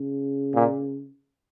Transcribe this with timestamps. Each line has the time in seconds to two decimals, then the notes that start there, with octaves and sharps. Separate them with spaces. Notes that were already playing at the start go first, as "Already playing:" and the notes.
Already playing: C#3
0.55 A#2